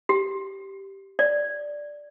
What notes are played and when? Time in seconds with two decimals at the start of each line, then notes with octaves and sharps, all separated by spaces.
0.09 G4
1.19 D5